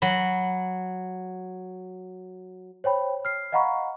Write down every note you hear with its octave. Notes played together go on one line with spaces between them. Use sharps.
F#3 B5
C5 C#5 G5 B5
F6 C7
D#5 F5 F#5 A#5 B5 C#6